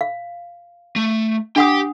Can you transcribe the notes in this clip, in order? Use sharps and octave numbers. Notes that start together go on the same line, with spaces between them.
F5
A3
D4 G4 F#5 G5 D#6